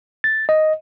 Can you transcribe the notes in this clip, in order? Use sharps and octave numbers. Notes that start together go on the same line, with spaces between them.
A6
D#5